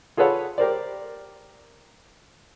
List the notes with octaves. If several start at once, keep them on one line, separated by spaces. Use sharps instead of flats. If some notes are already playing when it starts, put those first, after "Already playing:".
F4 G#4 A4 B4 C#5 F#5
G4 A#4 C5 D5